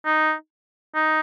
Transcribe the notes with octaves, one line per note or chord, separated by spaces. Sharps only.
D#4
D#4